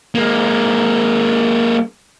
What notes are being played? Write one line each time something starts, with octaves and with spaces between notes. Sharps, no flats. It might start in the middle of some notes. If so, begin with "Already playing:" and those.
G#3 A#3